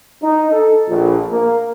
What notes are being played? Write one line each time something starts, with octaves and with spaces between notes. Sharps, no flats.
D#4
A4
A#1
A#3